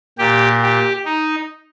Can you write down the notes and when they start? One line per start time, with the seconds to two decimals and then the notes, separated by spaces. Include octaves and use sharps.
0.18 A#2 G4
0.62 G4
1.05 D#4